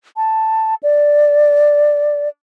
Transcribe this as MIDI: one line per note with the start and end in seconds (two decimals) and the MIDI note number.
0.16 0.75 81
0.83 2.28 74